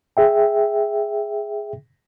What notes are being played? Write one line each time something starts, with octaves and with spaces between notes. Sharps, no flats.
G#4 E5 G5